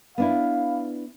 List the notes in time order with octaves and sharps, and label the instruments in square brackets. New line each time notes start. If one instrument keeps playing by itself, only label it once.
[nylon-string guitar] B3 D4 E4 [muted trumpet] F5